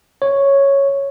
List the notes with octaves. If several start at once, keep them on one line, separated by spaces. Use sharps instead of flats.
C#5